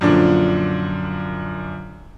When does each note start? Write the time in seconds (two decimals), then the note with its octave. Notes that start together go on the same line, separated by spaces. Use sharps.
0.01 F#2 A#2 D3 F3 D4